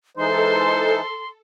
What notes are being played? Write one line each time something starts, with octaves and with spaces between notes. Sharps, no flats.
E3 G#3 D#4 A4 C5 C6